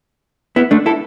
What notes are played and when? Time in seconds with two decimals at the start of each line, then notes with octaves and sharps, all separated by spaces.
0.56 B3 E4
0.71 A3 D4
0.86 E4 A4